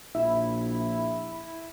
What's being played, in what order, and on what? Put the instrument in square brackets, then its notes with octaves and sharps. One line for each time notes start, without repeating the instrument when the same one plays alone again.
[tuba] A#1 [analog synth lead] E4 [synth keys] E5